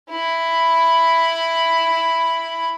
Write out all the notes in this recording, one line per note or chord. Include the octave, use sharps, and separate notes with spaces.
E4 B5